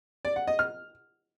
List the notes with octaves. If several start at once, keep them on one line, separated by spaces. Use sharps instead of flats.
D5
F#5
D#5
F6